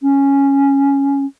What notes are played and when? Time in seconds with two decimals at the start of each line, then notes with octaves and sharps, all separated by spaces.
0.02 C#4